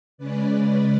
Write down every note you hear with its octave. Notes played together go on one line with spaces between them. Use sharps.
C#3 G#3 C#4 B4 D5